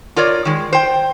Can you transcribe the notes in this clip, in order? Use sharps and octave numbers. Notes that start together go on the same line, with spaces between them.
F4 A#4 C#5 D5
D#3 G#3
C5 G5